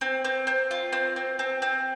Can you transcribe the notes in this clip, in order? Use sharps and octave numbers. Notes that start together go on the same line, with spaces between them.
C4
C4
C4
F4
C4
C4
C4
C4